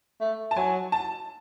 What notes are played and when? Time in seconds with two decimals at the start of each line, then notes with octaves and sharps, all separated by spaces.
0.21 A3
0.51 A5
0.57 F#3 G#5
0.92 A5